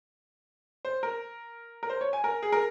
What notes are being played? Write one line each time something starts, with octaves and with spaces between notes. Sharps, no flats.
C5
A#4
A#4
C5
C#5
G#5
A#4
G#4
A#4